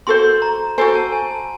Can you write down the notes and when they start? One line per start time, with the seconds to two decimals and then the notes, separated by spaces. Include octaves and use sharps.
0.07 F#4 A4 C5 C6
0.42 A#5
0.78 F#4 A4 C5 G#5
0.95 A5
1.12 G#5
1.31 A5